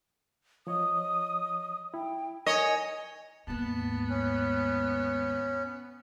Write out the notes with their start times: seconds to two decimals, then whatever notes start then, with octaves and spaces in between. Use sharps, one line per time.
0.67 F3 C#5 D#5 D#6
1.94 E4 G5
2.47 A#4 C#5 D#5 G#5
3.47 D#2 G#2 B3 A5
4.09 C#4